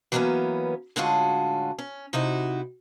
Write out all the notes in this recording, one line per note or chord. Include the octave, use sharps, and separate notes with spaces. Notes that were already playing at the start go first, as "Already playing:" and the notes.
E3 F#3 G3 A#3 B3 C#4
A2 D3 G#3 C#4 F4 F#4
C#4
C3 D#4 E4 F#4